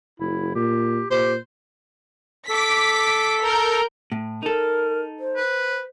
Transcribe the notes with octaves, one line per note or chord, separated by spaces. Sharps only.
F#1 E4
A#2 G4
A#2 G4 C5
A4 D6 B6
A#4 G6
A2
D#4 A4 A#4
C5
B4